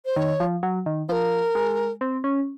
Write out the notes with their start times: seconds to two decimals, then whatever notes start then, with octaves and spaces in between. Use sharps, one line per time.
0.05 C5
0.16 D#3 C#5
0.40 F3
0.63 F#3
0.86 D#3
1.09 F3 A#4 C5
1.55 G#3
2.01 C4
2.24 C#4